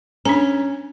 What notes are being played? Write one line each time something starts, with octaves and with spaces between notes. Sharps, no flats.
C#4 D4 A#5